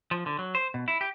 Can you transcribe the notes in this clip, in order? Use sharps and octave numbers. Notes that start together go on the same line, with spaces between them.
F3
D3
F#3
C5
B2
E4
G4